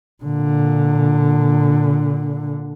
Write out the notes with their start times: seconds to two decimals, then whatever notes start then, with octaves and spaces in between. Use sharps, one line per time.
0.23 A#2 D3